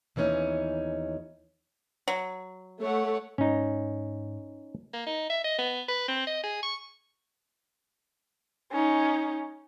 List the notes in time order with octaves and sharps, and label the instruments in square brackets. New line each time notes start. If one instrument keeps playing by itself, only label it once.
[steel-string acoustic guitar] D#2 E3 B3 C#4 D#4
[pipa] F#3
[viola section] A3 [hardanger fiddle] C#5 F#5
[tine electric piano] G#2 [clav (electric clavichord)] C#4 D#4
[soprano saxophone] A#3
D#4
E5
D#5
B3
B4
C4
D#5
G#4
C#6
[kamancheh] C#4 D#4